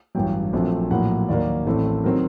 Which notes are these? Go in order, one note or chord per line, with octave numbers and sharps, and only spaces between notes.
A1 G2 F#3 G5
A#1 A#2 F#3 A3 C4
A#1 A2 F#3 A#3 F#5
D#2 D#3 F#3 A#3 D5
A1 A2 A3 C4
D#3 F#3 C4 A#4